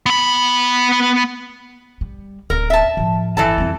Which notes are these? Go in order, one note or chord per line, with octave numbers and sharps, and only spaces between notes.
B3 B5
G3
D1 A#4
E5 A5
A2 F3
G1 E3 A4 A5
F2 G3